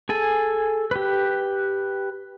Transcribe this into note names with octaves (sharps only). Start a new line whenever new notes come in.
G#4 A4 G#5
G4 B4